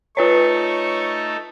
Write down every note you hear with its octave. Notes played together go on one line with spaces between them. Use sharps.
A3 D#4 F4 A4 B4 C#5 C#6